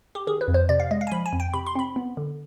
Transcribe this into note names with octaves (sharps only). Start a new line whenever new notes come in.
G4
D#3 G#4
B4
F2
C5
C3 D5
F5
G#3 D#5
F5
G#5
F3 B5
G#5
F2
G5
C3 B5
C6
C4 B5
B3
D3